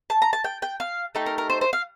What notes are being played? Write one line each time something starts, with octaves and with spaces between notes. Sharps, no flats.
A5
A#5
A5
G5
G5
F5
A3 D#4 G4
A#4
A#4
C5
C5
F5